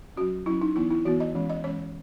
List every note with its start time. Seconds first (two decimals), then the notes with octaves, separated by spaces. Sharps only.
0.16 F#3 C#4 F#4
0.46 F#3 C#4 E4
0.61 D#4
0.76 E3 B3 E4
0.90 E4
1.05 E3 B3 F#4
1.20 D#5
1.35 E3 G#3 C#4
1.50 D#5
1.64 E3 G#3 C#4 C#5